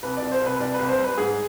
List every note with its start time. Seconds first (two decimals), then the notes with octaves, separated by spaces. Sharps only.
0.03 C2 B4
0.17 D5
0.22 C2
0.32 C5
0.41 C2
0.46 B4
0.60 C2 D5
0.74 B4
0.79 C2
0.89 C5
0.99 G3
1.04 B4
1.18 G#2 G#4